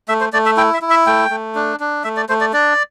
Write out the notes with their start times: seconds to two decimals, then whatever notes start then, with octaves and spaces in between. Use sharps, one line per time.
0.08 A3 E5
0.20 C5
0.33 A3 D5
0.46 E5
0.57 E4 G5
0.74 E5
0.82 E4
0.90 E5
1.06 A3 G5
1.31 A3
1.55 D4
1.80 D4
2.04 A3 E5
2.17 D5
2.29 A3 C5
2.41 D5
2.53 D4 D5